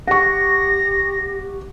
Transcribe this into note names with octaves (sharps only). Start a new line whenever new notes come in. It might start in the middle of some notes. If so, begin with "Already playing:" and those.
G4 F#5 C#6 A#6